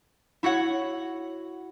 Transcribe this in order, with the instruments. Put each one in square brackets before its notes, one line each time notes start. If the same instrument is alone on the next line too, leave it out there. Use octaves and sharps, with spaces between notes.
[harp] E4 F#4 C#5 F#5